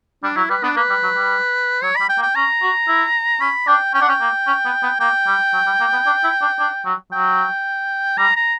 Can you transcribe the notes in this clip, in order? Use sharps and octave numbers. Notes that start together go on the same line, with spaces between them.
G3 D4
F#3 E4
G3 B4
B3 D4
A#3 B4
G3
F#3
G3
F#3 C#5
G3 B5
G5
A#3
G5
C#4 A#5
F#4
E4
C#4 B5
D4 G5
C#4 G5
D4 F#5
C#4 G5
A#3
C#4
B3
B3
A#3 G5
G3
F#3
G3
A#3
B3
D4
E4
D4
D4
F#3
F#3 G5
G3 A#5
A#5